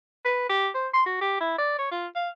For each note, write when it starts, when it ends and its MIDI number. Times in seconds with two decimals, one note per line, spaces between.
0.25 0.47 71
0.49 0.68 67
0.74 0.88 72
0.93 1.05 84
1.06 1.17 66
1.21 1.36 67
1.40 1.56 64
1.58 1.77 74
1.78 1.87 73
1.91 2.07 65
2.15 2.29 77